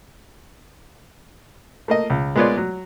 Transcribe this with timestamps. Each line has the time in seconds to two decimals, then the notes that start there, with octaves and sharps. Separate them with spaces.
1.88 A3 A#3 D#5
2.10 C#2
2.36 G#3 A#3 B3 F4 C#5 D5
2.57 F#3